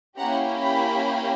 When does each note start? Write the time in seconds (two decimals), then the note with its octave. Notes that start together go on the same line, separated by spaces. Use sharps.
0.17 A#3 C#4 E4 G4 F#5 A#5
0.63 G5 B5